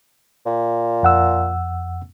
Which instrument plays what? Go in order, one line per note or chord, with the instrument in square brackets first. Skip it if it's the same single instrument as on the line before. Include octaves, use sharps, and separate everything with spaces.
[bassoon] A#2
[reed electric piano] F2 F#5 E6